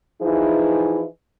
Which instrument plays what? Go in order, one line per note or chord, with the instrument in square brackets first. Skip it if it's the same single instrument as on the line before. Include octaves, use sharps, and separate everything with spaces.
[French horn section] E3 F3 D#4 E4 G#4